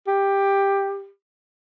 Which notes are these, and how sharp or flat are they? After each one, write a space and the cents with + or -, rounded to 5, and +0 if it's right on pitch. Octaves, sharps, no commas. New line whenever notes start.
G4 +10